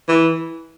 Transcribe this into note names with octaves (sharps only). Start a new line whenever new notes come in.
E3